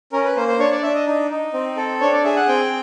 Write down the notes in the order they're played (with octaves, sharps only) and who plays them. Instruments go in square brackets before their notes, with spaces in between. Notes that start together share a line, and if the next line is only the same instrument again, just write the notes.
[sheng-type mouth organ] C#4 A#4
B4
A#3 C5
C5
D4 C#5
D5
D4 E5
D#5
D#4
D#4
C4
A4
D4 C#5
D5
G#4 E5
F#5
C4 G5